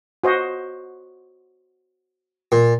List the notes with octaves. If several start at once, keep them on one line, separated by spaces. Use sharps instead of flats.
F#4 C5 D#5
A#2